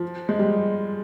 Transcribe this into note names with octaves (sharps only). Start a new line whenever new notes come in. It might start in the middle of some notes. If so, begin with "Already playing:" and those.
Already playing: F3
G#3
G3